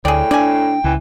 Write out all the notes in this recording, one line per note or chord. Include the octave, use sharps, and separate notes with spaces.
D2 A2 G#4 D5 G5
D4 D5 G#5
C#2 E3